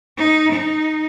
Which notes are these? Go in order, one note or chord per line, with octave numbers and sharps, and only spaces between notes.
D#4
D#4